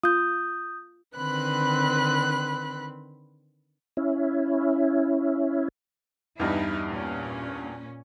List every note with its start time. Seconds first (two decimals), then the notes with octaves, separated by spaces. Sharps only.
0.03 F4 D#6 G6
1.16 D3 D#3 C4 B4 B5 F#6
3.97 C#4 E4
6.39 E2 G2 G3 D#4 E4
6.89 A#2 C#4